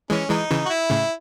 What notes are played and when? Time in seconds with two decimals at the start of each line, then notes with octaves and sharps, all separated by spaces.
0.10 E3 G#3 C#4
0.30 E3 G#3 D#4
0.50 C#3 E3
0.66 F#4
0.70 E4
0.90 A2 C#3